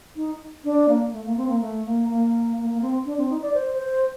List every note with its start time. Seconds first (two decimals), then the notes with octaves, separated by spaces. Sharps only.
0.16 D#4
0.64 D4
0.89 A#3
1.12 A3
1.25 A#3
1.37 C4
1.48 A#3
1.61 A3
1.85 A#3
2.09 A#3
2.58 A#3
2.70 A#3
2.82 C4
3.06 D4
3.18 C4
3.30 D#4
3.42 D5
3.54 C5
3.78 C5